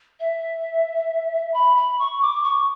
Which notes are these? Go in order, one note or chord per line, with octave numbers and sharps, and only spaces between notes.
E5
B5
B5
C#6
D6
C#6